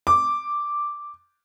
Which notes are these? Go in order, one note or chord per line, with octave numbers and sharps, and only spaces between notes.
D6